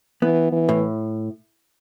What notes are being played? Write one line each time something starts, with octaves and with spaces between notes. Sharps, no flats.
E3 B3
E3
A2